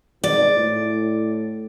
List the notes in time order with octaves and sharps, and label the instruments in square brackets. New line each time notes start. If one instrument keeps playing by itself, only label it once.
[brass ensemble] G#1 G#2 B2 [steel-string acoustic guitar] D5
[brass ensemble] A2